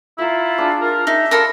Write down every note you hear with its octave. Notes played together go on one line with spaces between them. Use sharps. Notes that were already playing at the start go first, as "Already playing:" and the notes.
E4 F4 E5 A#5
D4 G#4
A#4
D#4 E5
F4 A4 A#4 B5